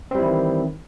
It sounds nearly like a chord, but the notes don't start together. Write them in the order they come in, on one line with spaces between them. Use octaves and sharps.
C4 G3 E4 E3 D#3